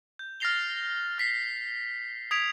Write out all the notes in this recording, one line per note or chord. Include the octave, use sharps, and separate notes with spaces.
G6
F6 A6 A#6 C7 F7 G7
F6 B6 C7
D#6 G#6 B6 D7 F7